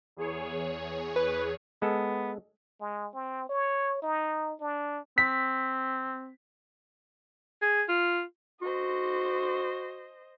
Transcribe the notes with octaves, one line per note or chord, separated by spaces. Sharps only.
E2 G#4 C#5
B4
G#3 B3 A4
G#3
C4
C#5
D#4
D4
C4 B6
G#4
F4
F#4 C5 D#5